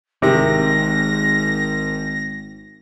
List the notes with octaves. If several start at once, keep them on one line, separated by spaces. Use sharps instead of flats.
G#1 G#2 C3 D#3 A#6